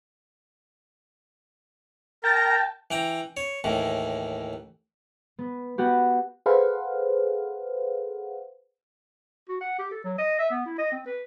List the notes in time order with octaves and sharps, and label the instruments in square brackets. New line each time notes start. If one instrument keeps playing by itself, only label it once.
[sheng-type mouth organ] A#4 A#5 [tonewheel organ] G5 A5
[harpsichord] E3 G5 A#5
C#5
D#2 A2 E3
[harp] B3
B3 F#4 G4
[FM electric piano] G#4 A4 B4 C5 F5 F#5
[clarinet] F#4
F#5
G4
A4
F#3
D#5
E5
B3
E4
D#5
C4
B4